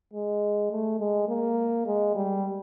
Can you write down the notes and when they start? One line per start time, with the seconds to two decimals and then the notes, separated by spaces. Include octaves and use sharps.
0.13 G#3
0.71 A3
1.00 G#3
1.28 A#3
1.87 G#3
2.15 G3